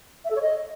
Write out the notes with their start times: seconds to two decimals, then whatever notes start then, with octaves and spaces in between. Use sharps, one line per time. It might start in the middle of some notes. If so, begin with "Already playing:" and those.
0.25 E5
0.30 A4
0.36 C#5
0.41 D#5